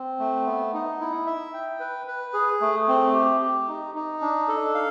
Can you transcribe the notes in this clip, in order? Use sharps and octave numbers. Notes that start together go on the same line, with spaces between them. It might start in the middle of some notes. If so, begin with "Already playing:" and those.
Already playing: C4
A3
B3
D#4
E4
E5
G5
B4
B4
G#4
A3
C4
G4
G4
D#4
D#4
D4
A4
F5